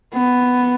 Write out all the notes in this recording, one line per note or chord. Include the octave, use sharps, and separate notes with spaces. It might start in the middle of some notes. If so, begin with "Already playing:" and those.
B3